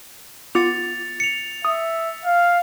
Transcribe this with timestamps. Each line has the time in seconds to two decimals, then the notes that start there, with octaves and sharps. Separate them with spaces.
0.55 B3 F4 D6 A6 C#7 F7
1.20 C#7 F7
1.65 E5 D#6
2.25 F5